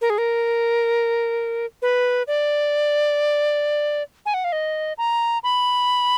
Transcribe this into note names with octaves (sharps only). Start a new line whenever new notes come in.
A#4
G#4
A#4
B4
D5
G#5
F#5
F5
D#5
A#5
B5